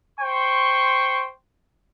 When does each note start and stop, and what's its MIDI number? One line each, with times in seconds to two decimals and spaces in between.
0.20 1.30 72
0.20 1.30 79
0.20 1.30 84
0.20 1.30 85